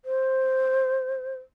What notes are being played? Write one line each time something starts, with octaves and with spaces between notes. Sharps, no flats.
C5